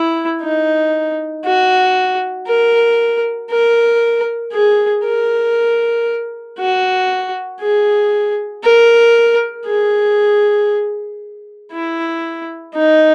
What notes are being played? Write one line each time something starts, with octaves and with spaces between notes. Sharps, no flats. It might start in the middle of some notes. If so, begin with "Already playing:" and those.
Already playing: E4
D#4
F#4
A#4
A#4
G#4
A#4
F#4
G#4
A#4
G#4
E4
D#4